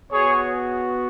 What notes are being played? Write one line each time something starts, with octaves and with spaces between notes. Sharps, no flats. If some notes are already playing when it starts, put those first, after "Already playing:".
B3 F#4 G#4 C#5